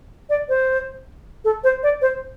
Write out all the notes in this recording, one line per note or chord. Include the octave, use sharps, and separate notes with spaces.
D5
C5
A4
C5
D5
C5